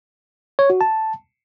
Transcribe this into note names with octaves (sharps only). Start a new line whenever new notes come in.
C#5
F#4
A5